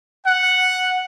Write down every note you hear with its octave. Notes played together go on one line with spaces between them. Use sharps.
F#5